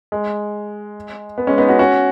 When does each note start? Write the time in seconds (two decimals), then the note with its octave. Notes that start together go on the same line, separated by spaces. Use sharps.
0.12 G#3
1.38 B3
1.47 G#3 C#4
1.58 B3 D#4
1.69 C#4 F#4
1.79 C#4 F#4